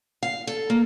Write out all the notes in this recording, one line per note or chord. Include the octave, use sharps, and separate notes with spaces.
F5
A4
A#3